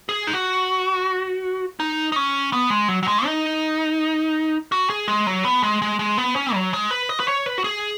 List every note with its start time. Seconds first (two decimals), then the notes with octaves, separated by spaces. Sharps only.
0.09 G#4
0.27 D#4
0.33 F#4
1.80 D#4
2.12 D#4
2.16 C#4
2.53 B3
2.70 G#3
2.88 F#3
3.03 F#3
3.08 G#3
3.26 D#4
4.72 F#4
4.90 G#4
5.08 G#3
5.27 F#3
5.44 B3
5.63 G#3
5.82 G#3
5.99 G#3
6.18 B3
6.36 C#4
6.54 F#3
6.73 G#3
6.91 B4
7.09 D#5
7.20 B4
7.28 C#5
7.46 B4
7.58 F#4
7.64 G#4